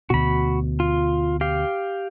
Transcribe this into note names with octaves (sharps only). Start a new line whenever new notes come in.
D2 B2 F#4 B5
F4
G4 F5